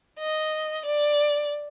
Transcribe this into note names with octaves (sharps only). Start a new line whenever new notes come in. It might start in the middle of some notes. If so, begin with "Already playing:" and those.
D#5
D5